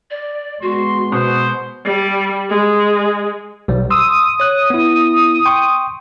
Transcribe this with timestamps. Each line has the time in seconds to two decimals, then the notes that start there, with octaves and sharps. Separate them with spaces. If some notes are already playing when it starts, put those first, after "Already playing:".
0.10 D5
0.62 G#3 B3 F#4 C6
1.12 B2 C5 D#6
1.85 G3
2.49 G#3
3.68 B1 G3
3.90 C6 D#6 E6
4.40 C#5 F#6
4.70 B3 E4
5.46 G5 C6 C#6